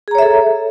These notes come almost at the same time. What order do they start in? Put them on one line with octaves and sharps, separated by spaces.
G#4 A#5 C#5 E5 A4